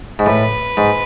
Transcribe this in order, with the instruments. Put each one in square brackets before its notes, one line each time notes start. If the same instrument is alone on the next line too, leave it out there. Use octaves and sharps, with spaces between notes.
[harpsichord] G#2
[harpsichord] A2 [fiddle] B4
[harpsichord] G#2